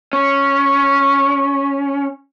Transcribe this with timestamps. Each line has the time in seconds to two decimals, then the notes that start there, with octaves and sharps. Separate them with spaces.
0.13 C#4 C#6